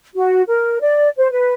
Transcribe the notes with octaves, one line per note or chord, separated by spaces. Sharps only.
F#4
A#4
D5
C5
B4